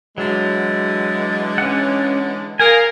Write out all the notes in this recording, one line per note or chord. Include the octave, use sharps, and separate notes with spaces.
D3 E3 F#3 G#3
C#4 F#5
G#4 A#4 F5 G#5